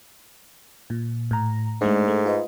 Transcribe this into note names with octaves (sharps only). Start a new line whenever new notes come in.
A#2
A2 A#5
G#2 G#3 A3 D4
A3
F4 B4 D#5